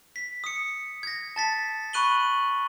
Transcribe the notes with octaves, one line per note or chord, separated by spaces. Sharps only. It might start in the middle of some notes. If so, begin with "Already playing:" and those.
B6
D#6 C#7
G#6 A#6
A5 A6 B6
B5 C#6 F#6 D#7 F#7 G7